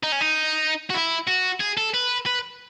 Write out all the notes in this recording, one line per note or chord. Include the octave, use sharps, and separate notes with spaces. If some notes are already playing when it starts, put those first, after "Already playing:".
D#4
C#4
D#4
F#4
E4
F#4
G#4
A4
B4
B4